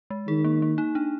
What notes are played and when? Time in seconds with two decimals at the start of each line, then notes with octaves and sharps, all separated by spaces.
0.10 G#3
0.28 D#3 G#4
0.44 A#3
0.62 A#3
0.78 D#4
0.95 D4